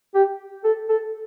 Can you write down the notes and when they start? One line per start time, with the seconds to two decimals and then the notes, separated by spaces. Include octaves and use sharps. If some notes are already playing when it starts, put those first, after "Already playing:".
0.15 G4
0.64 A4
0.89 A4